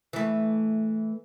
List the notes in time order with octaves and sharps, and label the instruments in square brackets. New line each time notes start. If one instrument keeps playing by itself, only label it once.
[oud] E3 A3